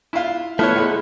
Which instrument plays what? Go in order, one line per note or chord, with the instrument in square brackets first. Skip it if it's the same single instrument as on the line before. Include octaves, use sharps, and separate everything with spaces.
[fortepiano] E4 F4
[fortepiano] F3 B3 [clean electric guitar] A3 E4 C#5
[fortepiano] B1 G#3 B5